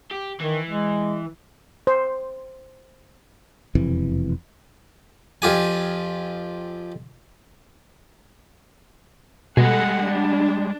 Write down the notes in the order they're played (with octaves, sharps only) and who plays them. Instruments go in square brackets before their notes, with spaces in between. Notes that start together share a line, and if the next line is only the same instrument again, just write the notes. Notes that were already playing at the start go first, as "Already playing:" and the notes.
[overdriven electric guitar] G4
[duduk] D#3 [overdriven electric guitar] E3
[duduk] G#3
[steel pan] C5
[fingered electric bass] E1 F2 C3 E3
[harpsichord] F2 F4 G4 G#5
[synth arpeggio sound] B2 [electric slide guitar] G3 G#3 G#4 [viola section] A4 F#5
[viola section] D4